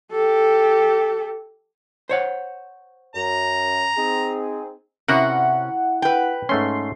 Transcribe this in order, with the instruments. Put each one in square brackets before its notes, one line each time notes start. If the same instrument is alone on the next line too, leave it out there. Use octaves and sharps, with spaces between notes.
[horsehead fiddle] G4 A4
[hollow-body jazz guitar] C5 C#5 F#5
[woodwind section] F#2 [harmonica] A#5
[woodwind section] C4 D#4 G#4
[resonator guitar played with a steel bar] C3 C#4 [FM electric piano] E4 F#5 [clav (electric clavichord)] F#4 A#4
[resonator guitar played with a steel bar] B4 G5
[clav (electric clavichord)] G#2 A3 C#4 [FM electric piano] C6